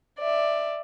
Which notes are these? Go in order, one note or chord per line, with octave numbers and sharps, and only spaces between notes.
D5 E5